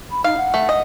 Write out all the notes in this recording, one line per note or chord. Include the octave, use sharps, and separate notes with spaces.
B5
D#4 F5
F#5
A3
D#5